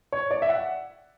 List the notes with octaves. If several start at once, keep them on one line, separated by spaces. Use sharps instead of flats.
C#5
D5
E5
F#5